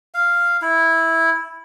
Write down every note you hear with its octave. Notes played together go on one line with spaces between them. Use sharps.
F5
E4